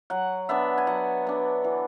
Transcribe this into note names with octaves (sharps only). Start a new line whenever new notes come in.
F#3 F#5
B3 D4 E5
G#5
F#3 F#5
B3 D4
E3